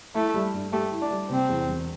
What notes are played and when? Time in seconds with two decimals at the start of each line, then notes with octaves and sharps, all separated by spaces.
0.15 A3 E4
0.34 G3
0.54 G2
0.73 A3 G4
0.91 E4
1.01 D4
1.11 G3
1.29 C3 C4
1.49 E2
1.68 E1